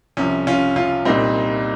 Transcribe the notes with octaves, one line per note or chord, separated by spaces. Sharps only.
C2 C3 F3 C#4
C#4 F4
C#4 F4
C2 A#2 G3 C4 D#4